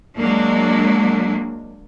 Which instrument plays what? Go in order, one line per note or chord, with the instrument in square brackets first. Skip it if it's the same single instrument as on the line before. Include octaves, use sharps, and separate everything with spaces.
[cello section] F#3 G#3 A#3 D4